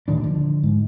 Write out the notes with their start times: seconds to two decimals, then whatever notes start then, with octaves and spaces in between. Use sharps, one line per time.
0.08 D2 A#2 D#3 D4
0.24 D3 F3
0.63 G#2